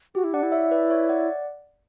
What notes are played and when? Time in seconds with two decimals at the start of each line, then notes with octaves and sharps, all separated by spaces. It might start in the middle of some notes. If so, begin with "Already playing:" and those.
0.15 F#4 G4
0.24 E4
0.34 D4 D5 F#5
0.43 E4
0.52 C#5 E5
0.71 B4 D5
0.90 C#5 E5
1.09 D5 F#5